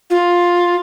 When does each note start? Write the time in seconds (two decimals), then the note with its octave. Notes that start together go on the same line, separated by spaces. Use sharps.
0.10 F4